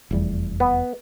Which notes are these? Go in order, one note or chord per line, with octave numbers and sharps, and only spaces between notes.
F1 E2 G3
B3